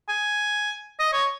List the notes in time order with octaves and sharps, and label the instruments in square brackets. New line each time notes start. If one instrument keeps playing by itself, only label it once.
[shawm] G#5
D#5
C#5